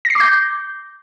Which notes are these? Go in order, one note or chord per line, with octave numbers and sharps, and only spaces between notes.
A#6
C7
D6
G6